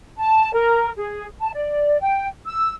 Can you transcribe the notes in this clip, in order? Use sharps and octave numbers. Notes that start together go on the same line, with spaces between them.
A5
A#4
G#4
A5
D5
G5
E6